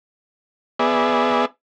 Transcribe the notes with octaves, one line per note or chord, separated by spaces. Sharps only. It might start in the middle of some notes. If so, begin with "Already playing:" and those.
B3 G#4 D5 E5